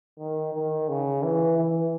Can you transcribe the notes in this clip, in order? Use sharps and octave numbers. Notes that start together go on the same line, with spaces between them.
D#3
D#3
C#3
E3
E3